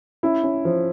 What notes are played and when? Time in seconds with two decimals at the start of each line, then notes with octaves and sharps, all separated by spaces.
0.23 C#4 E4
0.43 C#4
0.65 F3